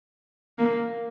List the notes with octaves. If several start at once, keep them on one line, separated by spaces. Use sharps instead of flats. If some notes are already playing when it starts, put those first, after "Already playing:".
A#3